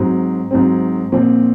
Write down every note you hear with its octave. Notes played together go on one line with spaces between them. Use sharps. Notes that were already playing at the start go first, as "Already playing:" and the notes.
Already playing: G#2 F#3 C4
G#2 F#3 C4
A#2 F3 C4